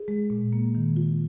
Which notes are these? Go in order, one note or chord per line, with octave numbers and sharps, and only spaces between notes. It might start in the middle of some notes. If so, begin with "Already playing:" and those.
Already playing: G#4
G#3
A#2
A#3
D#3
F4